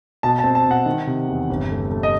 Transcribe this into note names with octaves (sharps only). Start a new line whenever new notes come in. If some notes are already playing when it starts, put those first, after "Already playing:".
B2 A5
A5
C4
A5
B2
F#5
D#3
C3
E2
G1
A3
A3
D#5